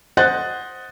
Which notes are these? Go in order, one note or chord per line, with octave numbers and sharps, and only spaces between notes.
C5 D#5 F#5 F#6 A6